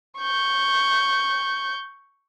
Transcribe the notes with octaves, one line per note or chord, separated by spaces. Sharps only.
C#6 G6